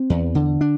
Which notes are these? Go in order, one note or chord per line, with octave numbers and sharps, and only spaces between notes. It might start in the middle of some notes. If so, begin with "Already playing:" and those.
Already playing: C4
E2
D3
D4